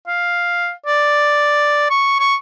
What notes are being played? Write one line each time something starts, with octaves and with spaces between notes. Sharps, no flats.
F5
D5
C#6
C#6